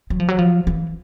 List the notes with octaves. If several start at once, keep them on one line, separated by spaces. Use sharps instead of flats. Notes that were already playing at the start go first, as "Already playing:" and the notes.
F#3
F3
F#3
F3
E3